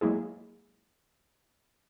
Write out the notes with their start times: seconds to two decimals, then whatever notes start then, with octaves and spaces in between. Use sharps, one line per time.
0.01 F#3 G#3 A#3 E4 G#4